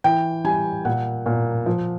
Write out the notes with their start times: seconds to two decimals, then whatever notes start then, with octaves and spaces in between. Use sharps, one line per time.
0.04 E3 G5
0.45 G3 G#5
0.85 A#2 F#5
1.26 A#2
1.66 F3